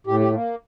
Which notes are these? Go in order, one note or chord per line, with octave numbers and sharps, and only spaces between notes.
A2 G4
G4
A#3